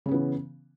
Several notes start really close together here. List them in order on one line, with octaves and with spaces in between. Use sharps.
C#3 C#4 B3 E3